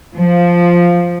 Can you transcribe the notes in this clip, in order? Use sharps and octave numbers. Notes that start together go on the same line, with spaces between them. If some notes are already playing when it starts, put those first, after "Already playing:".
F3